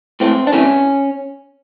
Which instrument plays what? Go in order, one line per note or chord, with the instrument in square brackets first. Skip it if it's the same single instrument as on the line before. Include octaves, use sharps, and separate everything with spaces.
[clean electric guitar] A2 E3 A3 C4
D4
C3 E3 A3 C#4